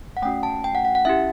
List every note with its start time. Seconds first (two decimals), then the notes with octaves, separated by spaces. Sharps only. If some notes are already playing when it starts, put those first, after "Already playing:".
0.17 F#5
0.22 A3 C#4 F#4 G5
0.43 A5
0.64 G5
0.75 F#5
0.85 F#5
0.95 F#5
1.05 C#4 E4 G4 E5